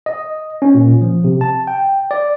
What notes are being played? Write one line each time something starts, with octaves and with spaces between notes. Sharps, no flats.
D#5
C#4
A#2
F3
C3
A5
G5
D5